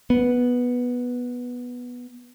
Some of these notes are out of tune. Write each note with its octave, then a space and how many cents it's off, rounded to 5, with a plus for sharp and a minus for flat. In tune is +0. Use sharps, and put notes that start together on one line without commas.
B3 -5